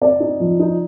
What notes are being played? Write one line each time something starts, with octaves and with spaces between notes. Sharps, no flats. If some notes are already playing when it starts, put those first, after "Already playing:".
C4 D5
D#4
F3
D#4